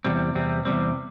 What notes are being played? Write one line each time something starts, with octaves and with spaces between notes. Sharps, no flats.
E2 C3 G3 C4
E2 C3 G3 C4
E2 C3 G3 C4